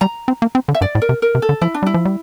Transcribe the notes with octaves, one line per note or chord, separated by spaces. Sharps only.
G3 A#5
C4
A#3
C4
D3
E5
G2 D5
A2
A#4
C3
A#4
C3
A4
D3
F3 E4
D4
G3 E4
F3
G3